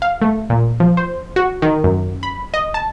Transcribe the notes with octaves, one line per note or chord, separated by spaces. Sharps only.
F5
A3
A#2
F3
C5
F#4
D#3
F#2
B5
D#5
A5